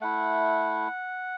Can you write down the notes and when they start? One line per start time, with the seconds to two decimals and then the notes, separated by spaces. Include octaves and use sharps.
0.01 A3 E4 F#5